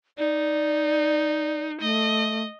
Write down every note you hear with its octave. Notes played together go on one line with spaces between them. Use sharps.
D#4 D5
A3 D#5